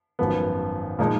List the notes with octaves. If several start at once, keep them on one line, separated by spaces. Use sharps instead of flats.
G#1 F#2 F3 B3
A#2 F3 G#3 D#4